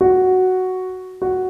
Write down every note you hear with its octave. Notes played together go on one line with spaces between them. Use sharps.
F#4
F#4